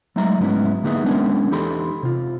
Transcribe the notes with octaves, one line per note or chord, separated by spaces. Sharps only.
F#3 G#3 A3 D#4 E5 A#5
G#2 F#3 G#3 B3 C#4 E4
D3 A#3 B3 D#4 G#4 E5
G#3 B3 C#4 D4 A#4 C#5
E2 D#4 G4 A4 B5 C6
C3 F4